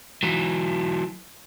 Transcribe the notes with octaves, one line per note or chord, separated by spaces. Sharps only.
E3 F#3